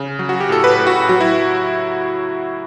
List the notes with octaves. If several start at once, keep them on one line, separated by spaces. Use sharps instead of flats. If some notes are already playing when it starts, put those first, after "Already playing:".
Already playing: C#3
F#3
F#4
G4
A2 A4
B4
A2
F#4
F#3 F#4
E4